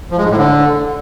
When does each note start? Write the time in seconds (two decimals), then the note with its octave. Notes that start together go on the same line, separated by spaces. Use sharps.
0.11 F3
0.18 G#3
0.24 G#2
0.31 A2
0.37 D3